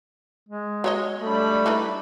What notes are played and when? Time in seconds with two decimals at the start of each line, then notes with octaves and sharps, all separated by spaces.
0.49 G#3
0.84 F#3 C#5 D#5
1.21 G3 A3 D4 B5
1.66 E3 D#4 B4